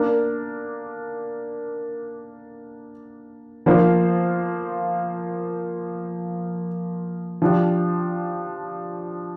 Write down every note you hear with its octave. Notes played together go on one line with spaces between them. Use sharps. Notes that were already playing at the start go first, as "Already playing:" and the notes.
Already playing: A#3 D4 A#4
F3 A#3 F4 C5
F3 D4 G4